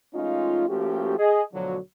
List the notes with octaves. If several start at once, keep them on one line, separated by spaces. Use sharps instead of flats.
F3 G#3 A3 C#4 D#4 F4
F3 A3 A#3 C#4 F#4 G4
G#4 D#5
D2 B2 D3 F3 F#3